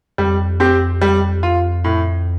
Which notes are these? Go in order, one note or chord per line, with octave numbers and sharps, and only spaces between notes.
F2 G3
C4 G4
G3
F4
A2